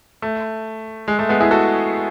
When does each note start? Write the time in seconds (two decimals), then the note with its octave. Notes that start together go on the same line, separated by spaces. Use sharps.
0.22 A3
1.08 G#3
1.19 A3
1.29 G#3 B3
1.40 E4 G#4
1.51 F#4 A4